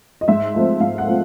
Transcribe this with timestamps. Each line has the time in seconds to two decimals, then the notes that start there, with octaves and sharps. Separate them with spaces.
0.21 D#5
0.28 G#2 E5
0.54 F3 A3 C4
0.80 G#2 F5
0.98 F#5
1.07 F3 A3 C4